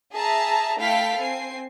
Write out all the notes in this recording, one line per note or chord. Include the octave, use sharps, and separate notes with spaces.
G#4 E5 A5 A#5
A3 E4 A4 F5 G5 B6
C4 G#5 C7